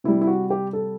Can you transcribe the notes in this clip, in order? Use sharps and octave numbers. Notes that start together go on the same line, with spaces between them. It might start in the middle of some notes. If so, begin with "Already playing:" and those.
C3 G3 E4
E4
F#4
G4
A4